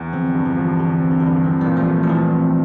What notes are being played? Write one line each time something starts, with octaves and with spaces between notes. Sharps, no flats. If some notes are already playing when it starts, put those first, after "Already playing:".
Already playing: E2
D3 F3 C4
G2
E3
F3
D3 G4
C4
D3
G2 E3
D3
E3 C4
E3 G3
A#2
F3 A3
A3
F3
A#2 E3
C4